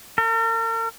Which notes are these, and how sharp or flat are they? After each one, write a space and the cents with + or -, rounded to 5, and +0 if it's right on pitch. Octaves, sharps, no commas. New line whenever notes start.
A#4 -45